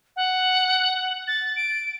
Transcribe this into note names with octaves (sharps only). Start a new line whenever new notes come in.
F#5
A6
D7